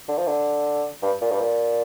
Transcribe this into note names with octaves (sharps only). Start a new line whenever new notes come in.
D3
F3
D3
G2
A#2
G2
A#2